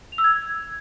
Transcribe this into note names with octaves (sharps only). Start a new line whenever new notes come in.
F7
E6
G#6